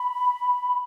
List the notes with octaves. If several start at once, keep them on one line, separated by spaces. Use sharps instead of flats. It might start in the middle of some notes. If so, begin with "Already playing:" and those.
Already playing: B5